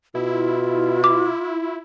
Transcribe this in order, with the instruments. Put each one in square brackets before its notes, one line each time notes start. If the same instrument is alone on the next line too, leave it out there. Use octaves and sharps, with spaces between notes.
[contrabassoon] B2 [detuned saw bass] E4 [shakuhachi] F4
[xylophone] D6